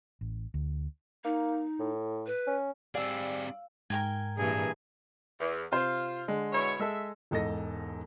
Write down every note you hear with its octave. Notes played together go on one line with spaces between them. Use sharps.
A1
D2
A#3 D#4
A2
B4
C#4
G3 C4 G#4 D5 F5 E6
G#2 A#4 G5 G#5
G2 A#2 E3 G#4
E2
C3 F4 C5
D3 G#3
B2 E4 C#5
G#3 A4 E5
E1 G#2 A4 D#5 A#6